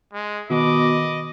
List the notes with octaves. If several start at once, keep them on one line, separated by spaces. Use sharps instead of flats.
G#3
B2 D#3 D#5 B5 D6